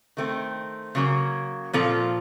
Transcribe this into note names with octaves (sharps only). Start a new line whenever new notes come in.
D#3 A3 C4
C#3 F#3 A#3
A#2 F3 C4 F4 A4